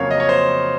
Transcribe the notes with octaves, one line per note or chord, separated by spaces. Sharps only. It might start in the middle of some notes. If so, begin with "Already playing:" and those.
Already playing: F2 C#3 F#3 A#3 C#5 F5
D#5
C#5
C5